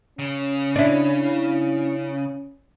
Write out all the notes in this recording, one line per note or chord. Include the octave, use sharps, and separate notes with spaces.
C#3 C#4
D4 E4